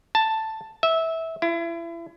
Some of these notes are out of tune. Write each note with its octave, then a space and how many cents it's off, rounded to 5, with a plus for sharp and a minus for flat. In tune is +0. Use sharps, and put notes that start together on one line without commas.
A5 +5
E5 -15
E4 +35